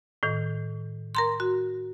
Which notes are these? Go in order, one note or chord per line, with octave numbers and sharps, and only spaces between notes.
A2 D#3
A#4 A#5 C6
F#4